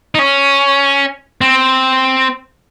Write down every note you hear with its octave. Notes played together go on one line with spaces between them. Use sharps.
D#4
C#4
C4